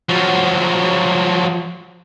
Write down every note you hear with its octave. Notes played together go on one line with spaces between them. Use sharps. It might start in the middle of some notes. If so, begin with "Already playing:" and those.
F3 F#3